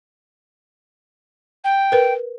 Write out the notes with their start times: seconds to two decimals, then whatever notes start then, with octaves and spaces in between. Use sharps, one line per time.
1.64 G5
1.92 A#4 B4